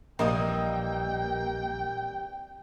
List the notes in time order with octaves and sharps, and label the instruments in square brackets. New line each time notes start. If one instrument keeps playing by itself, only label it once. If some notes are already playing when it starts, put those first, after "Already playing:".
[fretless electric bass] A#1 [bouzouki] C3 E3 G3 [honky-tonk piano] A#3 D#5 D#6 [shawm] G5